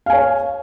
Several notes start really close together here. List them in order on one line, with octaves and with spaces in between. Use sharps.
F5 G#5 C#5